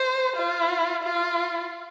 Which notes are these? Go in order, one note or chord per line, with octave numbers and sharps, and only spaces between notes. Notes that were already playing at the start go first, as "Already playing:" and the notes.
Already playing: C5
F4
F4